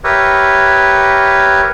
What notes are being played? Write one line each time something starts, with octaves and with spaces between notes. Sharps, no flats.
G4 A#4 B4 C#5 E5